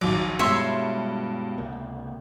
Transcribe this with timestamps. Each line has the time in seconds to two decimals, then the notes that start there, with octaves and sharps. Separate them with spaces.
0.01 A#1 D#2 F#3 D6
0.39 G2 B2 G#3 C#5 E5 C6
1.58 C#2 C3 A#3